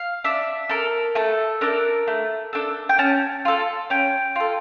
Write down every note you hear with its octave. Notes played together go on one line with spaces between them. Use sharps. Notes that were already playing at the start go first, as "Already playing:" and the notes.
Already playing: F5
D4 E5
A4 A#4
A3 A4
D4 A4 A#4
A3
D4 A4
G5
C#4 A5
F4 A4
C#4 G5
F4 A4